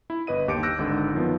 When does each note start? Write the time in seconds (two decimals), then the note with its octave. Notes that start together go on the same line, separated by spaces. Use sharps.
0.10 E4
0.27 G1 B4 D#5 D#7
0.48 G1 D#2 G4 D6 C#7 D7
0.63 E6 F#6 G6 A#6 D7
0.79 G#1 G#2 D3
1.14 F#2 D#3 F3 B3